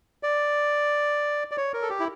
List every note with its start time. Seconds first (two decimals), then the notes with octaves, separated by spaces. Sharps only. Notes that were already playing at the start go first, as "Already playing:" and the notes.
0.23 D5
1.51 D5
1.57 C#5
1.74 A#4
1.82 A4
1.90 G4
2.00 E4